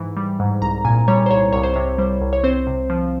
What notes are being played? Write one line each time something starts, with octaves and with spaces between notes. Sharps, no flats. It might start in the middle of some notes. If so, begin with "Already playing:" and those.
Already playing: G#2 E3
G3
G#2
C2 A#5
A#2 G#5
G3 C#5
C5
C2 C#5
C2 C#5
C5
C3 C#5
G3 C5
C2
C#5
C4 C5
C3
F3